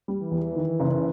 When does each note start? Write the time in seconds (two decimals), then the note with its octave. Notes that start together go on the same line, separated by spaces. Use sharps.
0.08 G3
0.19 E3
0.31 E2
0.56 D#3
0.80 F#1